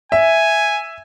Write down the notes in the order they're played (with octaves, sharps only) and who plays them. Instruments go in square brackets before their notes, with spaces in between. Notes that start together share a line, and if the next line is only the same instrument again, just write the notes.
[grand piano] E5 [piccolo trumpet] G#5